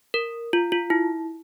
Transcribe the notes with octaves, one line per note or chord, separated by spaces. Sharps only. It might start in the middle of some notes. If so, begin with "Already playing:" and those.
A#4
F4
F4
E4